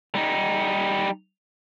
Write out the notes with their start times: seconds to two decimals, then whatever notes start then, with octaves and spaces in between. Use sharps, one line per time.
0.15 G3 D#4